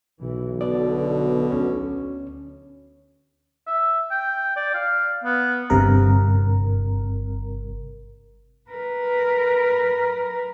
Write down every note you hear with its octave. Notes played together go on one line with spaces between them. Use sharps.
B1 B2 E3
B2 D3 D5
D2 C#4 C#5
E5
G5
D5
F5
B3
G1 G2 C3 A#4
A#4 B4